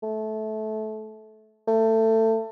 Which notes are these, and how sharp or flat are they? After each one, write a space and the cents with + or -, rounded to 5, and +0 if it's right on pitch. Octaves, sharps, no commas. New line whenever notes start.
A3 -20
A3 +20